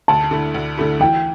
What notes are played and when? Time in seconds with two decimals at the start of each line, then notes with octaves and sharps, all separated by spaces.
0.08 D2 A5
0.31 D3 A3 E4
0.54 D2
0.77 D3 A3 E4
1.00 E3 G5